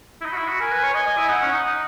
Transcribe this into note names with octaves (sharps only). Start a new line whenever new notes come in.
E4
D#4 B5
F#4
E4
F#4
A#4 G#5
B4
C#5
D#5 G#5
D#5
E4
D#4 F#5
C#4
D#4
D#4